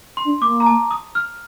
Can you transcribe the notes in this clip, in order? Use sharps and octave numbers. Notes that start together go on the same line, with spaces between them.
C6
D4
A#3 D6
A#5
A5
D#6
F6